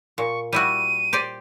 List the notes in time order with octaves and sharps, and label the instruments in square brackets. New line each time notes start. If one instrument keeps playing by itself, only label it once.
[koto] A#2 [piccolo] C#6
[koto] G3 E4 F#4 [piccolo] D#7
[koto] G4 C5 D5